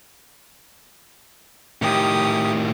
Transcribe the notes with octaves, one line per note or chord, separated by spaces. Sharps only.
A2 D#3 G4 D#6